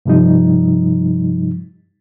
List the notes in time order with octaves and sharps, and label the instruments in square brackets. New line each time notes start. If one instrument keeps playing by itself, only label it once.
[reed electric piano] G2 C3 F3 G3 D#4